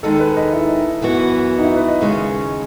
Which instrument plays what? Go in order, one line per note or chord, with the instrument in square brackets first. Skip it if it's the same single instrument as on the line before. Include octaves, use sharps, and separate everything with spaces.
[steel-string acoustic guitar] D#2 D#3 G#3 [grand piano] A4
[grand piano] B4
D#5
E4
[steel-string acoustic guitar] F#2 E3 B3 F#4
[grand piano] D#4
E4
B4
D#5
[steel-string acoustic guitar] D#2 C#3 G#3 C#4